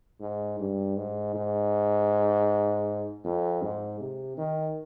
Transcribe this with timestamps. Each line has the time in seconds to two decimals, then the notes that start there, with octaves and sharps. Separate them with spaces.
0.21 G#2
0.59 G2
0.97 G#2
1.35 G#2
3.25 F2
3.62 G#2
4.00 C3
4.38 D#3